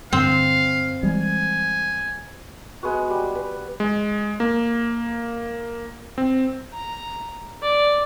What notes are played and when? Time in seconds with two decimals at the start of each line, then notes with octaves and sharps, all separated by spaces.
0.13 G2 D3 C4 F5
1.03 E3 G3 G#3 G#5
2.83 G#3 B3 F#4
3.10 G3
3.35 B4
3.80 G#3
4.40 A#3
6.18 C4
6.73 A#5
7.62 D5